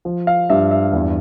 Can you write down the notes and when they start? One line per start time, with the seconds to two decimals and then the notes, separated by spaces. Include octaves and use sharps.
0.05 F3
0.27 F5
0.50 G2 E5
0.71 E5
0.93 E2